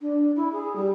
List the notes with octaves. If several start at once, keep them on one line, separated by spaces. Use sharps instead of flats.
D4
E4
G#4
G3